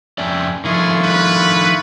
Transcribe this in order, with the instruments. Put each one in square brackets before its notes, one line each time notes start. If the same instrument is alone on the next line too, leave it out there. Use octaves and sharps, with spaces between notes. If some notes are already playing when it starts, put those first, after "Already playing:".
[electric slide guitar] F2 C#4 D5 [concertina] E5 G5 G#5
[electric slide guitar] D#3 F3 A3 [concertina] E4 F4 C#6 [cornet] G#4
[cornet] B4